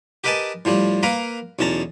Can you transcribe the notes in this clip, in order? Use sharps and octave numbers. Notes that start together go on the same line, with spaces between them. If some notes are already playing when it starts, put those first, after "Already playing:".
G4 A#4 B4 D#5 G#5 A5
A2 F3 G3
A#3 A#4 B4 F5 A#5
B1 E2 C#4 A5 A#5